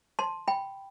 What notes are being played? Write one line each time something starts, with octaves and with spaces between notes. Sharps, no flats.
A5 C6
G5 B5